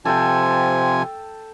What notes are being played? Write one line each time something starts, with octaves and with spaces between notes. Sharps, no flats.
C3 F3 A4 G5 G#5